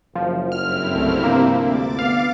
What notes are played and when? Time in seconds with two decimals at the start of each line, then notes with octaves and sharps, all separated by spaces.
0.15 F#1 F3
0.52 G2 C4 E4 F6
0.91 C2 A3
1.24 C3 F3 A#3
1.61 D2 D6 A6
1.99 B3 F5